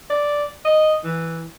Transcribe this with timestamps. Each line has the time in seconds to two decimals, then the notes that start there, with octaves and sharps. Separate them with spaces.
0.10 D5
0.65 D#5
1.04 E3